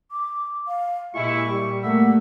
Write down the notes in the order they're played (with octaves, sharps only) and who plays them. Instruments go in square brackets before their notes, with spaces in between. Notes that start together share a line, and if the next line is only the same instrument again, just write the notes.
[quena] D6
F5
[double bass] A#2 [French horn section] G#3 E4 [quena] G4 [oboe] C#6
[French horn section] G3
[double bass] A3 A#3 [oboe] E5 [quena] F#5